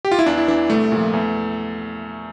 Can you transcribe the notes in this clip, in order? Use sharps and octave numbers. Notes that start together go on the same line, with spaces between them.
G4
F4
E4
E2 D4
E4
E3 D4
C2 A3
A#2 F3
E2